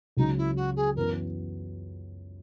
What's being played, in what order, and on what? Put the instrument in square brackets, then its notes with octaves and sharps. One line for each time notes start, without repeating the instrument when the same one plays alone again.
[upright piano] C#2 C#3 F#3 [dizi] D#4
[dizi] E4
F#4
G#4
[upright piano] F#2 E3 B3 [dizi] A#4